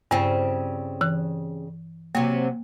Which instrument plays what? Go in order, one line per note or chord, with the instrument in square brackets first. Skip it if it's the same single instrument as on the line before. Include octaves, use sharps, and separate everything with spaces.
[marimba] G2 [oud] C#3 G3 C4
[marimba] E3 F#6
[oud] C3 F#3 [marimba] A#3